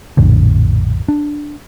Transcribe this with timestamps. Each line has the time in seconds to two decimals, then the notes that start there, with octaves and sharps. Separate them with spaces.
0.17 A#1 F2 A2 D3
1.08 D4